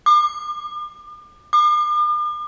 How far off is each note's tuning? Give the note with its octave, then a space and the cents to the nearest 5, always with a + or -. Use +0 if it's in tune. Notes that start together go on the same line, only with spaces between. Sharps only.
D6 +40
D6 +45